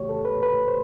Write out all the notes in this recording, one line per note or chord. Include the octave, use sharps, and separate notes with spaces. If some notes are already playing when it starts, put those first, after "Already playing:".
Already playing: F2 C#3 E3 A3 F#4 G4 C#5
A4
B4
B4
C5